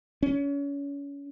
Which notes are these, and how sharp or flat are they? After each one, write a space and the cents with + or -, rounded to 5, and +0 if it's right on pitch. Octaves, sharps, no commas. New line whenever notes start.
C#4 +30